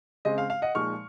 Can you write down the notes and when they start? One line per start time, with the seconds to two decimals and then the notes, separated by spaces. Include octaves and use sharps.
0.25 C#3 G#3 C4 D#5
0.38 F5
0.50 F5
0.62 D#5 F#5
0.75 A#2 F3 G#3 D#4 C#6 F6